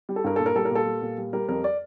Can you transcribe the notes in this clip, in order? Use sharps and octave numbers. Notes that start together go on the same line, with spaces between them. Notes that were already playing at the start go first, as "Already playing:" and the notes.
G3
A4
G2 A#4
A#2 A4
A#4
G3 A4
A#4
A#2 A4
G3
A#2
G3
G3 A#4
F2 A#4
D5